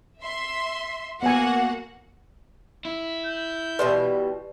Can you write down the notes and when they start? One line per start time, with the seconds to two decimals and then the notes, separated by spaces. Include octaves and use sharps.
0.22 E5 C6
1.23 A#3 B3 F#4 F#5 G#5
2.85 E4
3.26 G6
3.79 B2 E3 G3 B4 D5 C6